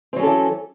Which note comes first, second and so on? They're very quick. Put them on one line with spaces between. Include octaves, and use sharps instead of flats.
C4 F#3 C#4 A4 E3